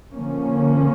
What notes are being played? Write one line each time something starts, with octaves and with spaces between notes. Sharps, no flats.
D3 F3 A#3 C#4